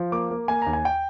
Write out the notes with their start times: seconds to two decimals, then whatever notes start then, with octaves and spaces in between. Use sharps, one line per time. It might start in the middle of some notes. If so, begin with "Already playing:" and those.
Already playing: F3
0.12 A#3 D6
0.31 A#3
0.48 A#3 G#5
0.62 D#2 A#5
0.73 G#5
0.85 G5